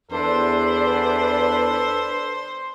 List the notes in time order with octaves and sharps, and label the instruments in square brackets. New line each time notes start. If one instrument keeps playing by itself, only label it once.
[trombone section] E2 [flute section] D4 B4 D5 [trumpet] A4 [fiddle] C5